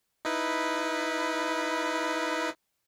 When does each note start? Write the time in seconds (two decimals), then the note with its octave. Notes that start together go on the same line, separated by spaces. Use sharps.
0.25 D#4 E4 B4